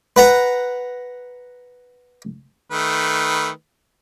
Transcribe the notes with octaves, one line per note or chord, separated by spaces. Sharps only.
B4 F#5 A#5
D#3 A3 B4